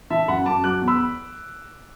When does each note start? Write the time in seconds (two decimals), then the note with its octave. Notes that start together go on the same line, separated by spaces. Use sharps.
0.10 E3 E5 A5
0.28 F#2 F#5 B5
0.46 F#2 A5 D6
0.64 F#3 D6 F#6
0.82 E2
0.88 B5 E6